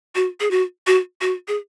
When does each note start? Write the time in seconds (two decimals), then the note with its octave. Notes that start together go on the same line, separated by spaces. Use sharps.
0.15 F#4
0.40 G#4
0.51 F#4
0.87 F#4
1.21 F#4
1.48 G#4